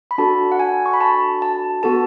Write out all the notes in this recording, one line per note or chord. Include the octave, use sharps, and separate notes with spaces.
B5
D4 F#4 A4 A5
F#5
G#5
C#6
B5
A5
A5
B3 F#4 A4 A5